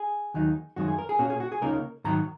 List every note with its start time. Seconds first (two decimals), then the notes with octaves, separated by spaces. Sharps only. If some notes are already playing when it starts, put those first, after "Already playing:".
Already playing: G#4
0.34 D#2 D#3 F#3 D#4
0.76 F#2 D#3 G#3 F#4
0.88 G#4
0.99 A#4
1.09 G#4
1.19 A#2 A#3 C#4 F#4
1.30 G#4
1.40 F#4
1.52 G#4
1.61 C#2 C#3 A#3 D#4 A#4
2.04 G#2 D#3 F#3 A#5